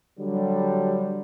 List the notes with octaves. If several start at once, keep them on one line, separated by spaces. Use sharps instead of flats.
D3 F#3 G3